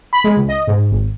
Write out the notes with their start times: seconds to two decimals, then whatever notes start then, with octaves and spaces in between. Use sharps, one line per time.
0.13 B5
0.24 G#3
0.37 C#2
0.49 D#5
0.67 G#2
0.91 G#1